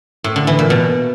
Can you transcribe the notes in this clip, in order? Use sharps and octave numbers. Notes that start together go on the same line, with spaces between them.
A2
D3
E3
A#2
B2